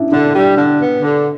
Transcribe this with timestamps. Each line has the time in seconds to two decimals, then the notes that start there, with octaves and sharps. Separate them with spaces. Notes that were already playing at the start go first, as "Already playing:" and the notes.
Already playing: C#4 D4 E4
0.11 D3 D4
0.35 G3
0.57 D3
0.79 B3
1.02 D3